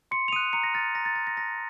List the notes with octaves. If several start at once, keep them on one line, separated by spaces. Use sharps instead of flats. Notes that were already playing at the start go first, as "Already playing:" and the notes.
C6 C#7
F7
D#6 F#6 D#7
A#5 C#7
A#6
F6 A6
A#5 A#6
A6
F6 A6
A#6
A5 A#6